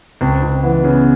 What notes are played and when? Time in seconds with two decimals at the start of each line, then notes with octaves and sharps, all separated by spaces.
0.21 C#2 C4
0.42 C#2
0.63 E3 B3
0.84 C#3